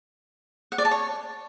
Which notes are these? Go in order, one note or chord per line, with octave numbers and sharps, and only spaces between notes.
F#5
D5
A5
C#5